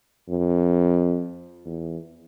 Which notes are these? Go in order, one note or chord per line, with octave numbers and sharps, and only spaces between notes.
F2
E2